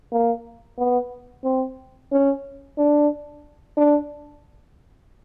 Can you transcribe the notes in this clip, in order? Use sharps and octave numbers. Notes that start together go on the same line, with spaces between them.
A#3
B3
C4
C#4
D4
D4